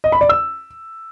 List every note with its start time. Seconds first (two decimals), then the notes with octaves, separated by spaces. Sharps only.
0.04 D#5
0.12 B5
0.21 D5
0.29 E6